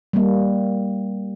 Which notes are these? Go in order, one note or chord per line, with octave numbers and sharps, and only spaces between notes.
G3 A#3